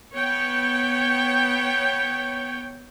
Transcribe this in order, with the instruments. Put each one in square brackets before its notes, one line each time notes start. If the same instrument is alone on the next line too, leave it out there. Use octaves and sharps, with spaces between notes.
[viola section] B3 C#5 G5